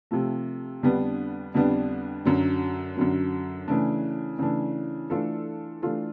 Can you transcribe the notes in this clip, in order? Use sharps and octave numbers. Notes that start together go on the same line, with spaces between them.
C3 F3 A3
F2 D3 G3 B3 D4
F2 D3 G3 B3 D4
F#2 D3 F#3
F#2 D3 F#3
C#3 E3 A3 D4
C#3 E3 A3 D4
E3 A3 D4 F4 A4
E3 A3 D4 F4 A4